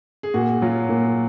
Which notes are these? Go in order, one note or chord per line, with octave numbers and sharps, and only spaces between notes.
G#4
A#2 F#4
F#3 F4
A#2